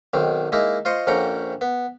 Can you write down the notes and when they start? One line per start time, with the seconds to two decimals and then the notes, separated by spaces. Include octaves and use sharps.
0.14 B1 D#3 C4
0.52 G#3 A#3 D#4 E4
0.85 F4 C5 D#5 C#6
1.07 A#1 F2 C#4 F#5 G5 A#5
1.61 B3